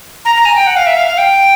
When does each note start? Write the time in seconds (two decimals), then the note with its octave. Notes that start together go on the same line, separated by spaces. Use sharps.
0.25 A#5
0.36 A#5
0.45 G#5
0.55 G5
0.67 F#5
0.76 F5
0.87 E5
0.97 F5
1.07 F5
1.18 G5